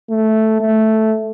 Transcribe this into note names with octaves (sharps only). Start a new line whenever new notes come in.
A3
A3